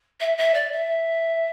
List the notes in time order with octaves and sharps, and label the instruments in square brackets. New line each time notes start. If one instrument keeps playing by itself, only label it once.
[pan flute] E5
E5
D5
E5